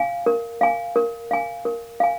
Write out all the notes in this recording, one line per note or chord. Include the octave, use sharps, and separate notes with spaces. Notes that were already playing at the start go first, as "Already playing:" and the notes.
Already playing: F5 G#5
A#4
F5 G#5
A#4
F5 G#5
A#4
F5 G#5